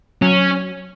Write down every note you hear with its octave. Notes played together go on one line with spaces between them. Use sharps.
F#3 C#4